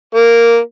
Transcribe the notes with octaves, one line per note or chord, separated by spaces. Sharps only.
A#3